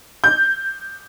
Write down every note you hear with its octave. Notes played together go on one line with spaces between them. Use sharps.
G6